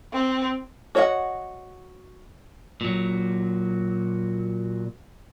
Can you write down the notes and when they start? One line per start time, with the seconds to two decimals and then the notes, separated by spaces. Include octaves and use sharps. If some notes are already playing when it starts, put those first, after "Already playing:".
0.13 C4
0.95 F#4 C#5 D#5 E5 F#5
2.81 A#2 F#3